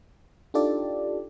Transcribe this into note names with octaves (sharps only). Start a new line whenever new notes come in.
D4 D#4 F4 G4 A4 D5